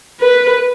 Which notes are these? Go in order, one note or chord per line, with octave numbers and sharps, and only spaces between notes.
B4